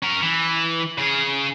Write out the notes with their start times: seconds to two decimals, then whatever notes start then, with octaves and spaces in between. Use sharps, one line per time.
0.02 C#4 A#4
0.22 E3
0.98 C#3 G#4